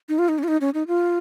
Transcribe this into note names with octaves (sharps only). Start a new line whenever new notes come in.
D#4
F4
D#4
C#4
F4
D#4
C#4
D#4
F4